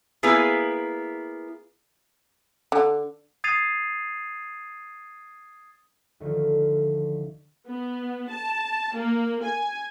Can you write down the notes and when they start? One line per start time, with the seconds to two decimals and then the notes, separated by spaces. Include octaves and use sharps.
0.23 A#3 B3 E4 G#4 B4
2.72 D3
3.44 D#6 G#6 A6 C7 D#7 F7
6.20 D2 D3 D#3 F3
7.67 B3
8.31 A5
8.96 A#3
9.44 G#5